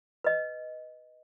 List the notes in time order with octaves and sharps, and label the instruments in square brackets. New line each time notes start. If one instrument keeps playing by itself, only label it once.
[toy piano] B4 D#5